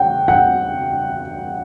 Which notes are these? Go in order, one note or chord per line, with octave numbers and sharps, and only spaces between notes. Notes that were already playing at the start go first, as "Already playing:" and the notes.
Already playing: F#5 G5
F#5